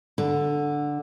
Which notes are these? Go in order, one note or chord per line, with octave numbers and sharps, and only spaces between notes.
D3